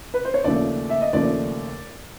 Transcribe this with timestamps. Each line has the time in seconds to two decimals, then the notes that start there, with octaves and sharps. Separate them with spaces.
0.14 B4
0.25 C5
0.34 C#5
0.44 D#2 C#3 F3 A3 D5
0.90 E5
1.01 D#5
1.13 D#2 C#3 F3 A3 D5